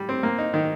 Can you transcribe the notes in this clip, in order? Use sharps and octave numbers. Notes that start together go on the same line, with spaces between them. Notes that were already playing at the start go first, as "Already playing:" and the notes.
Already playing: G3
C4
A#3
D#4
D#3